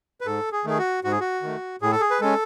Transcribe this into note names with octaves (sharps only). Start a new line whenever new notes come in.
B4
G#2 A4
G#4
D#3 A3 G#4
F#4
G#2 F#4
G#4
F#4
D#3 A3
A2 G#4
A4
G#4
B4
G#3 C#4 A4